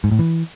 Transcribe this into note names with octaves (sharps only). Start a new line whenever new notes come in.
G#2
A2
E3